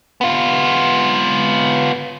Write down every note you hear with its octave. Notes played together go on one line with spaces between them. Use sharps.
B3 F4